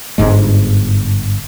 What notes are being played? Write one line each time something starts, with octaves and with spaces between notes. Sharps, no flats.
G1 G#2 G#3